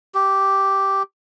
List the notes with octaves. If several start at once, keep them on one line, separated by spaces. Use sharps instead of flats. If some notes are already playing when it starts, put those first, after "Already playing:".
G4